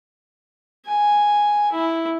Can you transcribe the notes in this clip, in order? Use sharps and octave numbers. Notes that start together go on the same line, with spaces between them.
G#5
E4